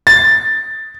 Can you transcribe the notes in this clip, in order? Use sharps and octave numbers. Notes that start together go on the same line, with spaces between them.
A6